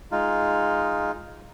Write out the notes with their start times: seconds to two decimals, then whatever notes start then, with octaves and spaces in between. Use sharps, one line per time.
0.12 G#3 D#4 F4